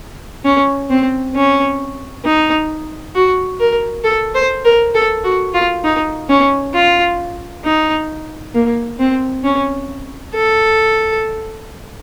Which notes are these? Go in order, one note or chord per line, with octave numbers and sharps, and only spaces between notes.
C#4
C4
C#4
D#4
F#4
A#4
A4
C5
A#4
A4
F#4
F4
D#4
C#4
F4
D#4
A#3
C4
C#4
A4